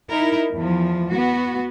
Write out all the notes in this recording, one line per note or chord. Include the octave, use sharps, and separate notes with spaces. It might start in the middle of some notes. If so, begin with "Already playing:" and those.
D#4 E4 A#4
E2 F3
B3 F#4